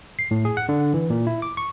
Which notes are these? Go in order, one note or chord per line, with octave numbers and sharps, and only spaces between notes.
C7
A2
G#4
F#5
D3
E3
A#2
E4
D6
C#6